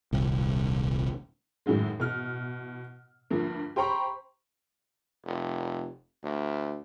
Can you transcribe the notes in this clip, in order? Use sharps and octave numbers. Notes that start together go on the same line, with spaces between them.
D#1 C2
F#2 A2 D#3 F#3 G#3
B2 E3 F6
D2 G2 F3 A#3
G4 C5 G5 A#5 B5 C#6
F1
D2